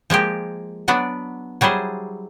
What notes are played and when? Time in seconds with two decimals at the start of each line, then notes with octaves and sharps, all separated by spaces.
0.10 F3 G#3 A#3 G4
0.88 F#3 B3 D4 D5
1.61 F#3 G3 E4 G#4 C5